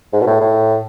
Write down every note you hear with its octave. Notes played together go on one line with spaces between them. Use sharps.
G#2
B2
A2
A2